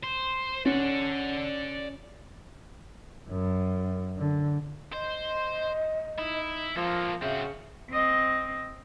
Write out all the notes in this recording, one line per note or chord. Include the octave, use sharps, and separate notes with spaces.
C5
C#4 D5 F#5
F#2
D3
C5 D#5
D#4 E4
F3 A#3 A4
C#3 C4 F#4 E5
C4 D#5